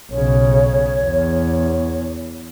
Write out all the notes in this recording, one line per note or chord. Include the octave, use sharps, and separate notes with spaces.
B1 C#3 C#5
E2